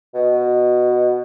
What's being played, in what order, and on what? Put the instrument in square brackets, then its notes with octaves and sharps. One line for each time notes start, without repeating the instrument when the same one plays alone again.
[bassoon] B2